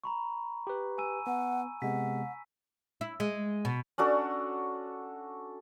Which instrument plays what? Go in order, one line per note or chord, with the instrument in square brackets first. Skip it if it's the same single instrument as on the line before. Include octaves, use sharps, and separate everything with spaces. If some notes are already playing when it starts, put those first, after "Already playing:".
[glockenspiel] A#5 B5 C#6
[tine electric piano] G4 B4
[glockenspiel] G#5 E6 D#7
[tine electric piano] B3 [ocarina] F#5
[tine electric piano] C3 G#3 B3 [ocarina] F#5 [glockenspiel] B6
[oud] E4
G#3
B2
[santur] C#4 D4 F#4 A4